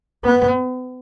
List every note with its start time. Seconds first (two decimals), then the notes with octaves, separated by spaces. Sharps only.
0.24 B3